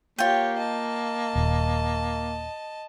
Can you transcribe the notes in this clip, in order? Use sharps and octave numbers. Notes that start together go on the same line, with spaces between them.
A#3 F4 G4 C#5 G5
D#5 A5
D#1